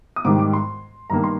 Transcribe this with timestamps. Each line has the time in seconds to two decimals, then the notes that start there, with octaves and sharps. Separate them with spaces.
0.16 D#6
0.25 G#2 D#3 G3 D6
0.39 D6
0.53 C6
1.10 G2 D#3 A#3 A#5
1.24 C6